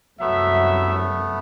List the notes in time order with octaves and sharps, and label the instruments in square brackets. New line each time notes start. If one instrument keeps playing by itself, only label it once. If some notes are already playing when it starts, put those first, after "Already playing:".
[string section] C2 F#2 [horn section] F#3 E5 [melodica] A3 B3